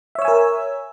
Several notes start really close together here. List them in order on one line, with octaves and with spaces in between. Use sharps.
E5 C#5 E6 G#5 A#4